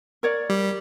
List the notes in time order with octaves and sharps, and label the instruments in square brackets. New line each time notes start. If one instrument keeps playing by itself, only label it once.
[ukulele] A#4 C#5 D5
[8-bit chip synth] G3